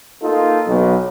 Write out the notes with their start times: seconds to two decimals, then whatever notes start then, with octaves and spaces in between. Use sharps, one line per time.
0.22 A#3 D#4 F4 A4
0.67 B1